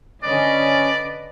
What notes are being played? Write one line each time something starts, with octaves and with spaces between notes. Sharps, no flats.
D3 C#4 B4 D5 D#5